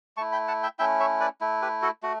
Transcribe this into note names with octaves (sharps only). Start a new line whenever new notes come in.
A3 E4 A5 C#6
G5 B5
F#5 A5
E5 G5
A3 C#4 E4 E5 G5
C#5 E5
B4 D5
A3 E4
G4 B4
F#4 A4
A3 F#4